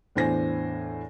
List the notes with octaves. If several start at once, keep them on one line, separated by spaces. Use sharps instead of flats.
E2 A2 D4 C5 G#5 A#6